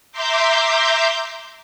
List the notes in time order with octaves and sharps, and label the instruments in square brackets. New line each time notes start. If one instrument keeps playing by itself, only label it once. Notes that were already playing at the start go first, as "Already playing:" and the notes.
[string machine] E5 A#5 C6 D6 G6